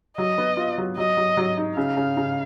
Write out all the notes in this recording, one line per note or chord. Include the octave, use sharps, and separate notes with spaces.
F#3 D#5
B3
F4
F#3
F#3 D#5
F#3
F#3
D#4
C#3 F5
C#3
C#3